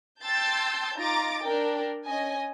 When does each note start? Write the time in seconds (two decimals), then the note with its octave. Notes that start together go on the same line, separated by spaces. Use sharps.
0.23 G5 A5 C6 E6 G6 A6
0.96 D#4 F4 A#5 D6 A6 D7
1.42 D4 A#4 G5
2.06 C#4 D#5 G#5